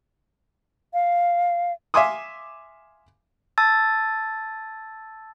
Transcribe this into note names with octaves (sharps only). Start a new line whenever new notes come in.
F5
E5 F5 G#5 C6 D6 D#6
A5 E6 G#6 A6